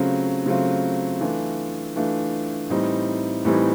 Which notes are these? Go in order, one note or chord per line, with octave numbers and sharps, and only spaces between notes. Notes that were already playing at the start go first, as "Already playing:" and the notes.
Already playing: C#3 F#3 A3 C4 F4
C#3 F#3 A3 C4 F4
E3 A3 D4 F4
E3 A3 D4 F4
A2 E3 G3 C4 D#4
A2 E3 G3 C4 D#4